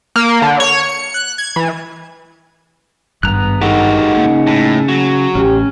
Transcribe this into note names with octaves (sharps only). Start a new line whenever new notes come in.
A#3
D3
C#5
C#7
F#6
G#6
E3
G#1 G2 B3 A#5 F#6
G#3 D#4 F#4 G4 A4 A#4
C#3 A#3
A2
F#3
A1 C#4 G4